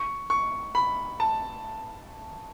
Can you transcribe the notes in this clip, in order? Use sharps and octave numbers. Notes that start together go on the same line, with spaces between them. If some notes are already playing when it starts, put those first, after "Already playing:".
Already playing: C#6
C#6
B5
A5